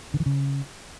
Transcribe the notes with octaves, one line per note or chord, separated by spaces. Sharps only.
D3
E3
C#3